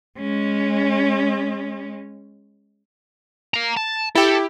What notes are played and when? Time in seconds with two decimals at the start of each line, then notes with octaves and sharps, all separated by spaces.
0.19 G#3 C#4
3.54 F5 A#5
3.77 A5
4.15 E4 G4 A4